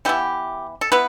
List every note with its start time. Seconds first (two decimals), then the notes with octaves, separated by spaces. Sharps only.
0.05 E3 B3 E4 G4
0.81 A4
0.92 B3 E4 B4